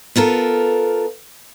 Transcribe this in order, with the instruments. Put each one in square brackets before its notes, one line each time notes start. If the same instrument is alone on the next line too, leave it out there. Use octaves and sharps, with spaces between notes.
[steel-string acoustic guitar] B3 F4 A4 A#4